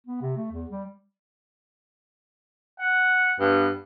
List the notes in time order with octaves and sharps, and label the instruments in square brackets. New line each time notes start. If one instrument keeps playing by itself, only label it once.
[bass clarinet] B3
C3
A3
E2
G3
[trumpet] F#5
[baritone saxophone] G2 [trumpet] B3